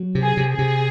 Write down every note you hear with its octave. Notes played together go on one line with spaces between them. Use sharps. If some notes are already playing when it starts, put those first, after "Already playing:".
Already playing: F#3
C3
G#4
C3
G#4
C3